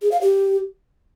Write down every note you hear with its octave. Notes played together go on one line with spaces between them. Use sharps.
G#4
F5
G4